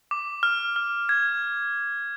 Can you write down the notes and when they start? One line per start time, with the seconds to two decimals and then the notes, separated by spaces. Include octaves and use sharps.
0.11 D6
0.43 F6
0.76 F6
1.09 G#6